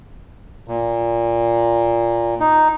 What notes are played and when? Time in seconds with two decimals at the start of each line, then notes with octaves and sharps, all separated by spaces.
0.68 A#2
2.40 D#4